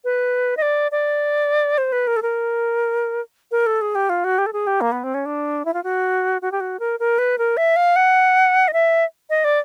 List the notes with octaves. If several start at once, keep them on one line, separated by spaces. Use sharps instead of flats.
B4
D#5
D5
D5
C5
B4
A#4
A4
A#4
A#4
A4
G#4
G4
F4
F#4
G4
A4
G#4
G4
A#3
B3
C4
C#4
D4
E4
F4
F#4
F#4
G4
F#4
A#4
A#4
B4
A#4
E5
F5
F#5
D#5
E5
D#5
D5